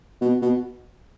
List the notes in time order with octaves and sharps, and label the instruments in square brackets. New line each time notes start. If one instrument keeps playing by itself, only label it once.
[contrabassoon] B2
B2